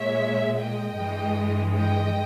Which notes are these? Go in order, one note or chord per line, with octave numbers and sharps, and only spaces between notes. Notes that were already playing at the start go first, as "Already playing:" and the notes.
Already playing: A#2 G#3 C#5 E5
D#5 G5
G2 E3 G#3
D#5 G5